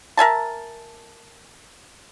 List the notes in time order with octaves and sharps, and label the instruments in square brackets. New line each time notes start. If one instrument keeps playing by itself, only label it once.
[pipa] A#4 E5 G#5 A5